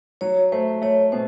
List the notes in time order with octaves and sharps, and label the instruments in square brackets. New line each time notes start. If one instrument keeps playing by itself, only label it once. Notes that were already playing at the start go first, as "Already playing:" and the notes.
[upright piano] F#3 [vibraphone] C#5
[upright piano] A3 [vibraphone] C5
[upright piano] A3 [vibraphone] C#5
[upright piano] B2 [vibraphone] C5